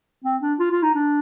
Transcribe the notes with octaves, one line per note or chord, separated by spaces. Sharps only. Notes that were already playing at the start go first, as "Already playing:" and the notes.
C4
D4
F4
F4
D#4
D4